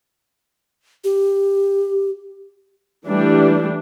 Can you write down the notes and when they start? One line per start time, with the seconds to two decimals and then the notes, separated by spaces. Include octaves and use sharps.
1.04 G4
3.06 E3 G3 A3 D4